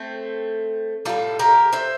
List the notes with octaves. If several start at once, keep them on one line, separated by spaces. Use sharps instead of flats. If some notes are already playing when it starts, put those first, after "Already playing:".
Already playing: A3 C4
A2 G3 F4 A4
G4 A#4
C5 E5